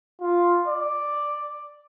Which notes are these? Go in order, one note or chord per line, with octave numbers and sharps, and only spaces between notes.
F4
D5